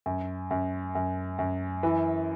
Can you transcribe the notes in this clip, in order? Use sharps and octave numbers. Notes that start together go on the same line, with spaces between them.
F#2
F#2
F#2
F#2
E3